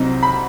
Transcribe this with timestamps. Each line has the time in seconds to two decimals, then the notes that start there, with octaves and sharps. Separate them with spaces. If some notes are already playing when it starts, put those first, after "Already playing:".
Already playing: C2 C3 F#3 C4 D#4
0.23 B5